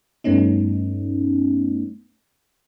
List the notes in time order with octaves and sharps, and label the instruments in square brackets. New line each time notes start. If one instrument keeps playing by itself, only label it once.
[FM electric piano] G2 A3 B3 C#4 D#4